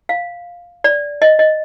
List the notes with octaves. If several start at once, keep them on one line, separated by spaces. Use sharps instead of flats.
F5
D5
D#5
D#5